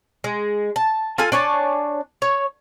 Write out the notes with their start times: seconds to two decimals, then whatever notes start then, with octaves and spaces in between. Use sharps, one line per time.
0.24 G#3
0.76 A5
1.18 F4 A4 G#5
1.32 D4 C#5 G#5 A5
2.22 C#5